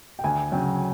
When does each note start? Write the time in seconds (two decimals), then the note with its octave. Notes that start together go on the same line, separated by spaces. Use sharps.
0.19 G5
0.24 D2 G#5
0.52 C#3 F#3 G5